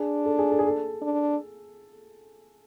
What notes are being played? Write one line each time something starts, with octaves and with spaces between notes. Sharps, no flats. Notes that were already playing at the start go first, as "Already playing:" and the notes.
Already playing: D4 G#4
A4
G#4
A4
G#4
A4
D4